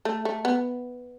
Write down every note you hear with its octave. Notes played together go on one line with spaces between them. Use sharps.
A3
A3
B3